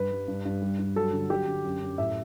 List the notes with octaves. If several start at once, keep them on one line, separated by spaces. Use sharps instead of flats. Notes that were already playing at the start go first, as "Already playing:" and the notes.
Already playing: G2 B4
G3
G2
G2
G3
G2
F#3 A4
D3
F#3 G4
D3
F#2
F#2
A2 E5